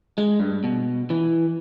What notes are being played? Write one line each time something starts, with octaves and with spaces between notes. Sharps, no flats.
G#3
G2
B2
E3